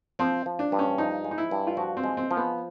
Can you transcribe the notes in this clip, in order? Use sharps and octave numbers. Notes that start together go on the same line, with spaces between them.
F3 C4
F3
D4
G2
C#4
F3 D#4
G#3
D#4
E4
G2
F4
F3 F#4
C4
G#3
C4
F3
B3